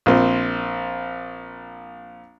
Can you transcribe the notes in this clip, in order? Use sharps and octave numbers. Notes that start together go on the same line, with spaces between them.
A#1 C4